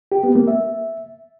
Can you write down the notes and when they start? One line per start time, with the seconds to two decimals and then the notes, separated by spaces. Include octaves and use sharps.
0.12 G4
0.24 B3
0.35 A#3
0.47 E5